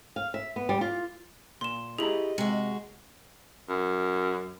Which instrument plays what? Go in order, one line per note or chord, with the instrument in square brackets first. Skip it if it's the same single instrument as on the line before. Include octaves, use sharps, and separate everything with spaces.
[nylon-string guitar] F5
E5
B3
G3
F4
[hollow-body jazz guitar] A#2 [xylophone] C6 E7
[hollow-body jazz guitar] E4 G4 A#5 [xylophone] G#4 F#7 [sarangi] D#5
[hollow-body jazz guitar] C3 [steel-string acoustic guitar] G#3 F#4
[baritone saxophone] F#2